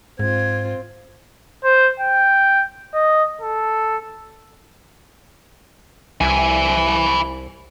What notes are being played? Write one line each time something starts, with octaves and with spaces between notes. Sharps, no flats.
G#2 C4 F4 G#6
C5
G5
D#5
A4
C2 E4 G#5